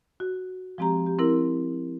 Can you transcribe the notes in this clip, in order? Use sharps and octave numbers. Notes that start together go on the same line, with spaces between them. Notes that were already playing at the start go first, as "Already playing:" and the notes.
F#4
F3 G#3 C4 G4 A#5
G4
C4 E4 A#4